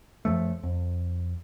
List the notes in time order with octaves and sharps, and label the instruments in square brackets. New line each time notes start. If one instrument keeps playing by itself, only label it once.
[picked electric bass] F#2 F3 A3
F2